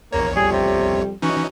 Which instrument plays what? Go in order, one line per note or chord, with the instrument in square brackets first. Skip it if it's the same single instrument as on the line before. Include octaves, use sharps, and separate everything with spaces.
[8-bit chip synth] A#1 E2 C#5 [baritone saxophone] A#3
[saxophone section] F2 G3 [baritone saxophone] G#4
[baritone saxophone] C3
[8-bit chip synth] E3 C#4 D#4 [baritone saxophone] F#4